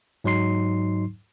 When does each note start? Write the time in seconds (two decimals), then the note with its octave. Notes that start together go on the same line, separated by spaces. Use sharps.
0.24 G#2 F#3 D#4 C6 C7